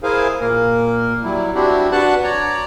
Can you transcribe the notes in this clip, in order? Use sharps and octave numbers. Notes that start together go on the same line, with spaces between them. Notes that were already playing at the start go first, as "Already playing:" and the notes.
E4 G#4 A#4 C5 F5 G#5
A#2 A#3 A#4
F#3 G3 E4
G3 C4 D4 E4 F#4 G4
D4 F#4 B4 F#5 A5 F#6
C#5 D5 A#5